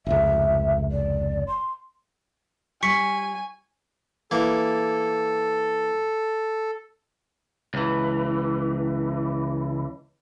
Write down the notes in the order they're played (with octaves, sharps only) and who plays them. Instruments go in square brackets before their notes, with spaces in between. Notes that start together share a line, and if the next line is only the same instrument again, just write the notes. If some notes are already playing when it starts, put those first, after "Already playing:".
[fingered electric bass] F1 C#2 [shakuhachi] E5
[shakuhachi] D5
C6
[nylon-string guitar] G3 [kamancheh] G#5 [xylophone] C#6 B6 C#7
[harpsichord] E3 A#3 [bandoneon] A4
[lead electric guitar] C#2 E3